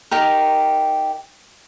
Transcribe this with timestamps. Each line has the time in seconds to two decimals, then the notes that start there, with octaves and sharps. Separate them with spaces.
0.11 D#4 G4 A#4